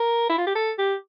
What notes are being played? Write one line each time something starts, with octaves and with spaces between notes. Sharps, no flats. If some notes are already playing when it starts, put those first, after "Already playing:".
Already playing: A#4
E4
F4
G4
A4
G4